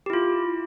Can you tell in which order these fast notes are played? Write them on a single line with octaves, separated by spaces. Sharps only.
G4 E4 F4